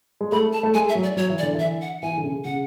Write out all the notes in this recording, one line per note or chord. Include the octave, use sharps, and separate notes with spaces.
G#3
A3 B5
A5
A3
G#3 G#5
E5
F#3
D5
F#3 C#5
E3
D5
D3
E3 E5
F#5
E3 G#5
D3
C#3
C#3 F#5